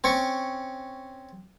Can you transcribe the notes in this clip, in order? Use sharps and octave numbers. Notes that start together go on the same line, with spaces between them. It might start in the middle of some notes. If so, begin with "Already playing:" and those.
C4 C#4 C#6